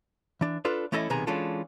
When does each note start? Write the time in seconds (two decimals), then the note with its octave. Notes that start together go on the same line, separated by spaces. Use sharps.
0.41 E3 D4
0.65 D4 F4 A4 B4
0.92 E3 A3 C#4 E4 A4 D#5
1.10 B1 C3 D#3 B3 G#4 A#5
1.27 E3 G#3 C#4 D4 F4 A4